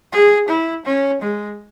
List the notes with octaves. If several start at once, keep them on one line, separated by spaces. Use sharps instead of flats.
G#4
E4
C#4
G#3